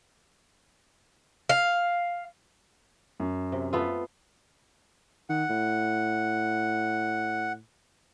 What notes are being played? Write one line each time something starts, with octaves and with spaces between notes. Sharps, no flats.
F5
F#2
C3
A3 B3 F4
D#3 F#5
A2